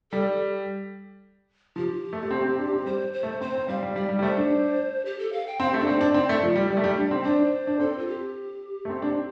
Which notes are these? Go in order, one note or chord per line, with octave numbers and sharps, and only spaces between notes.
G3 A4
F3 G4
A3
A3
C4
C4
D4
C4
G3 C5
C5
A3
C4 C5
C4
G3 F5
G3
G3 D5
G3
G3
A3 C5
D4
G4
A4
F5
G5
C4 F5
G4
A3
D4 A4
C4 C5
D4
C4 D5
A3
F3
G3
G3
A3
G3
D4
C4
D4 C5
D4
C4 A4
F4
G4
A3
C4
D4
C4